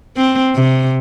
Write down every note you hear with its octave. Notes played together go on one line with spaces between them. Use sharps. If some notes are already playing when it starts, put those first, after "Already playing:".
C4
C3